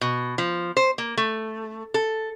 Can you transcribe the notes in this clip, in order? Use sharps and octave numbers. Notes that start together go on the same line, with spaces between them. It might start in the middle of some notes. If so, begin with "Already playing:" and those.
B2
F3
C5
A#3
A3
A4